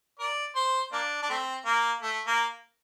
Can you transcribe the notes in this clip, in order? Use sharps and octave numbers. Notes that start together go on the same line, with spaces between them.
A#4 D5
C5
A#3 D4
D4
A3 C4
A#3
A3
A#3